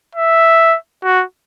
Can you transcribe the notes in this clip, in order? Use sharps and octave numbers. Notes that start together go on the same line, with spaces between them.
E5
F#4